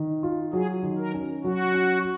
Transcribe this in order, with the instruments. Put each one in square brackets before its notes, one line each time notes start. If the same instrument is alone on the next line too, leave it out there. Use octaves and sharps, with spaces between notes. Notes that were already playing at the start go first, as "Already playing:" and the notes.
Already playing: [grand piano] D#3
F4
[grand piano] F#3 [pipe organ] G#4
[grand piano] D#3
[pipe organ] A#4
[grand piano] C#4
[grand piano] F#3 [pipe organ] F#4
[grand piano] C#4